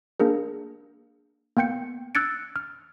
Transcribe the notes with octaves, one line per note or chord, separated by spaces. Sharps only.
A#3 D4 G#4 A#4
A#3 B3 G5 G6 C#7
E6 F#6 G#6 A6 C#7 D7
F6